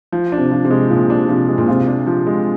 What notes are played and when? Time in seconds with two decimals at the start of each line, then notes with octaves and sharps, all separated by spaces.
0.12 F3
0.32 D4
0.38 C3
0.51 F3
0.65 C3
0.71 G#3
0.90 A#2 F3
1.10 D4
1.29 C3 F3
1.48 G#3
1.58 A#2
1.68 C3 F4
1.88 D4
2.07 F3
2.27 G#3